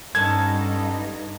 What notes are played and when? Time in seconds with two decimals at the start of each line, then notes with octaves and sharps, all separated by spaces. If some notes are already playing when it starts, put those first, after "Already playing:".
0.15 G2 B3 C#4 D#4 A4 G#6